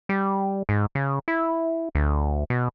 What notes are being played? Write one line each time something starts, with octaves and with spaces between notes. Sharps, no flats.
G3
G#2
C#3
E4
D2
B2